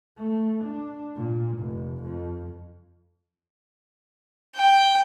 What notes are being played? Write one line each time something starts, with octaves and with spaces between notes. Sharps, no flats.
A3
D4
A#2
F1
F2
G5